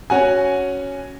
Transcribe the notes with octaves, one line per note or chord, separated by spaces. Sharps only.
C#4 F#4 F#5 G#5